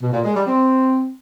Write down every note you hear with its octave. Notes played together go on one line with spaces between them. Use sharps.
B2
A#2
G#3
G3
C4